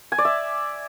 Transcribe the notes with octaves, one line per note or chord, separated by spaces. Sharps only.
G#5
D5
E5